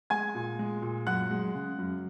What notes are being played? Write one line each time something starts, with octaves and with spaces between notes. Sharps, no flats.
G#3 G#5 G#6
A#2
G#3
A#2
F#2 F#5 F#6
G#3
C#3
F#2